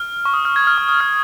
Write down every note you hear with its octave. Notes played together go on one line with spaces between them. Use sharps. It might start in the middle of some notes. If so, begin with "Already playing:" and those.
Already playing: F6
C#6
D#6
F6
G#6
F6
D#6
D#6
F6